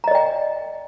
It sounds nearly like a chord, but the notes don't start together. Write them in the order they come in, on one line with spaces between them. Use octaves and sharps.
A#5 D#5 D5 G5